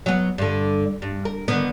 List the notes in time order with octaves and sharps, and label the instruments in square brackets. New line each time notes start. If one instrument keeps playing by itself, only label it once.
[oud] F#3 B3
G2 D3
G2
A#4
D3 D#3 B3